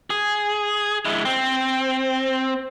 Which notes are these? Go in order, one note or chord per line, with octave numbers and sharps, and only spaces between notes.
G#4
G#3 E4
C4